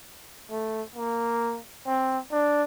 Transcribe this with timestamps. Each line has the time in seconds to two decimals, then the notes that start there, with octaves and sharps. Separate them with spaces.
0.51 A3
0.96 A#3
1.87 C4
2.31 D4